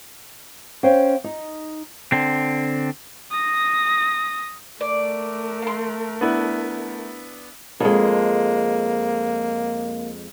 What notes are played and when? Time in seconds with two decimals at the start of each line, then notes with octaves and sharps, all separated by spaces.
0.83 C#4 C5 F5 G5
1.24 D#4
2.12 D3 C4
3.31 D#6 A#6
4.81 A3 A#4 D5
5.62 F5 C6
6.21 B3 D4 E4
7.80 F2 G#3 A#3